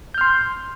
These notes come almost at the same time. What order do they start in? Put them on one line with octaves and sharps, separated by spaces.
G6 F6 C6